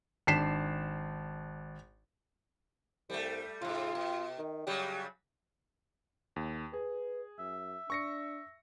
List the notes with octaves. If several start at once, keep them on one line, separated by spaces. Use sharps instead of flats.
G#1 D4 B6 C7 E7
C2 G3 A3
G#2 C3 F4
B2
D#3
C#3 F#3 G3 G4
D#2
G#4 B4
F#2 E5
D4 C#6 A#6 C#7